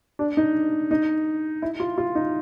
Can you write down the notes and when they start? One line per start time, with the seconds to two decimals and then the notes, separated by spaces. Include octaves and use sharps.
0.19 D4
0.37 D#4
0.91 D#4
1.62 E4
1.80 F4
1.98 F4
2.15 D#4